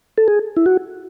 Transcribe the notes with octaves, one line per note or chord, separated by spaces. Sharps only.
A4
G#4
E4
F#4